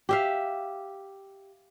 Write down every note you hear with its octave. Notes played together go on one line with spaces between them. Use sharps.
G4 E5 F5